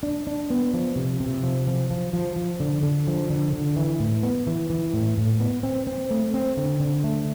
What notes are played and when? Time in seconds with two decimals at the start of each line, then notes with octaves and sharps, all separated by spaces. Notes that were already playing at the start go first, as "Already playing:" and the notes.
0.03 D4
0.27 D4
0.50 B3
0.74 F3
0.96 C3
1.20 C3
1.43 F3
1.67 F3
1.91 F3
2.13 F3
2.36 F3
2.60 D3
2.83 D3
3.07 F3
3.30 D3
3.53 D3
3.76 E3
4.00 A2
4.23 B3
4.47 E3
4.70 E3
4.93 A2
5.18 A2
5.40 B3
5.63 C4
5.87 C4
6.11 A3
6.34 C4
6.57 D3
6.80 D3
7.04 A3